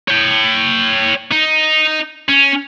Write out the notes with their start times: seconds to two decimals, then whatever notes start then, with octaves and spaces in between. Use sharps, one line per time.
0.08 C#5 G5
1.31 D#4
2.29 C#4